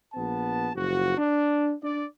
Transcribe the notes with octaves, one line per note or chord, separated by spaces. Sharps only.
A#1 B3 A5
F#1 F3 F#4
D4
D4 D5